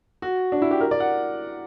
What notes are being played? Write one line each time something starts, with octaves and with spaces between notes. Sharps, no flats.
F#4
D4
E4
G4
A#4
D5
F#5